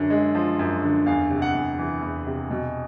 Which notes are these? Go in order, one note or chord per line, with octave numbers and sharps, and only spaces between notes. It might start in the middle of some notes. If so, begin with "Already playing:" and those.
Already playing: F#2 D3
G#3
F3
F#2
D3
E2 F5
C3
F#5
E2
E3
E2
C3
B2